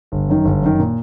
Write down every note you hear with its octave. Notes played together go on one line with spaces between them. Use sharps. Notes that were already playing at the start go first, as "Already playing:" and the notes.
G1
F#2 D#3
G1
F#2 D#3
A#2